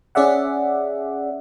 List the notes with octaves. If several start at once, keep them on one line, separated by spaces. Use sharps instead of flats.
C#4 G#4 D5 E5 F#5